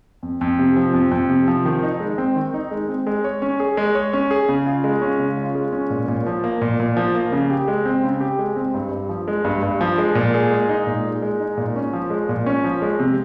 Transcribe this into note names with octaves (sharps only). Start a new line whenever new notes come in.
F2
F2
C3
F3
F2
F2
C3
F3
D#3
D#4
G#3
C4
D#3
D#4
G#3
C4
G#3
C#5
C#4
G#4
G#3
C#5
C#4
G#4
C#3
F4
G#3
C#4
C#3
F4
G#3
C#4
A#2
A#2
F3
A#3
A#2
A#2
F3
A#3
C#3
G4
G#3
C4
C#3
G4
G#3
C4
G2
G2
F3
G#3
G2
G2
F3
G#3
A#2
G#4
G#3
D#4
A#2
G#4
G#3
D#4
A#2
C#4
F3
G#3
A#2
C#4
F3
G#3
C3